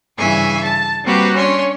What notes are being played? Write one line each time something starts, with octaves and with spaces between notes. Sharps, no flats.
G2 C#3 E3 E5 G#5 C#6
A5
G3 A#3 C4 F#4 G4 B4
C#4 D4 C#5 C6